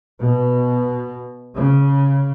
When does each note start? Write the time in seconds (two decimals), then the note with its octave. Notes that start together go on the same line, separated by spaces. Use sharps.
0.18 B2
1.58 C#3